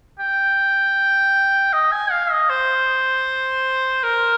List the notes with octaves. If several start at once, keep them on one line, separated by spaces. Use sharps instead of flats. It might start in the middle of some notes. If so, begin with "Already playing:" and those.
G5
D#5
G#5
F5
D#5
C5
A#4